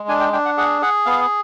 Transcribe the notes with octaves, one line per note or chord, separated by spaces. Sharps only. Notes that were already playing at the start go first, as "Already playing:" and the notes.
Already playing: G#3
D4 G#5
G5
D4 G5
F#5
G#4 F#5
G#4 F#5
B3 F5